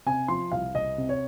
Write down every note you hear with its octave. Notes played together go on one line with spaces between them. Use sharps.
C3 G#5
F3 C6
C2 F5
C2 D#5
C3
C#5